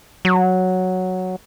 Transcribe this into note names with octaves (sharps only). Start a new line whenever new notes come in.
F#3